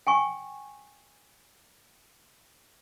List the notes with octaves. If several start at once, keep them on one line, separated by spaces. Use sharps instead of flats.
G5 G#5 C#6